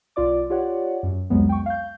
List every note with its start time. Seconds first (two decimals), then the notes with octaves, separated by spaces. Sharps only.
0.16 B1 F4 D5 D6
0.50 F4 G4 C#5 D5 F#5
1.03 F#2
1.30 C2 F2 F#3 G#3 B3
1.49 G5 C#6
1.66 F5 G6